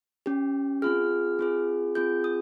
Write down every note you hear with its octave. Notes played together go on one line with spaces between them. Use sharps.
C#4 G4
C4 F4 G#4 F6
C4 F4 G#4
C4 F4 G#4 G6
D#6